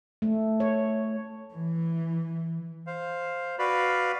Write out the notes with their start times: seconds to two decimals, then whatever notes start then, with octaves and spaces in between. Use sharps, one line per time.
0.22 A3
0.60 C#5
1.53 E3
2.87 C5 F5
3.59 F#4 B4 D5 F5 B5